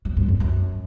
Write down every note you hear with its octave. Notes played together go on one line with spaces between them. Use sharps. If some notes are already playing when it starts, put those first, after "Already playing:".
F#3
G2
F2
F#2